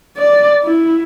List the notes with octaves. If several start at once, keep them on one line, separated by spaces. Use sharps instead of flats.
D5
E4